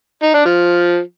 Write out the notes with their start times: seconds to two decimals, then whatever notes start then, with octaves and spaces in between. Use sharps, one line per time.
0.23 D#4
0.34 D4
0.45 F3